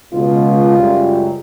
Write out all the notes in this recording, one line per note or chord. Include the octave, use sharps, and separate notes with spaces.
C#2 B2 F4
C#2 F#2 G3